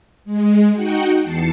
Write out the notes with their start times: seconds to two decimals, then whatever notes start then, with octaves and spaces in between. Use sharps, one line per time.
0.25 G#3
0.73 D#4 F#4 F#5 G5
1.21 E2 A5 C7 C#7